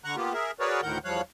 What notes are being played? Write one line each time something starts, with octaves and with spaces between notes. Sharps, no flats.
D3 F#5 A#5 C#6 F#6
A#3 B3 F4 G4
G#4 A#4 E5
F#4 G#4 A#4 B4 C#5 D5
D2 A2 D#3 A#4 F#5 G6
E2 F3 G3 C#5 F5 F#6